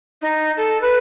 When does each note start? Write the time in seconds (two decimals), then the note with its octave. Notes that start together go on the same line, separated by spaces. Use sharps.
0.21 D#4
0.57 A4
0.81 B4